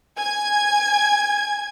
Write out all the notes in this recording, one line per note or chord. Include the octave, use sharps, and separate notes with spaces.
G#5 G#6